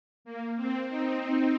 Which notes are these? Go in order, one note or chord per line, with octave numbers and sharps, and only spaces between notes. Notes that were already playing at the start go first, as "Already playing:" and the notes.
A#3
C4
C4 D#4